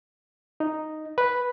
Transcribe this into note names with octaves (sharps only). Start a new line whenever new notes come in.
D#4
B4